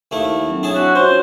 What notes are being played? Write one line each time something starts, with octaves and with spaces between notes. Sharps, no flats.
D#2 A3 E4 F5 G5 A5
F#3 C4 D4
D4 E4 G#4 C#5 A5
F#4 E5
C#4 F4 F#4 C5 C#5